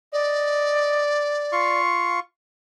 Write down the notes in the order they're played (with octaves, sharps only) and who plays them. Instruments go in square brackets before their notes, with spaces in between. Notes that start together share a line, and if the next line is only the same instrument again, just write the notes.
[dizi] D5 [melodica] D#5
[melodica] F4 F5 C#6